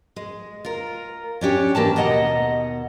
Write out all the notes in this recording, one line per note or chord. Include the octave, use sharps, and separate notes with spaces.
G#3
F4 A#4
C#4 D4 G4 C#5
E3 A#3 G4 A5
D#2 B2 D#5 F#5 A#5